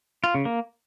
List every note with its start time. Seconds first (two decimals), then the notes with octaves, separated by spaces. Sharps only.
0.24 F4
0.35 C#3
0.45 A#3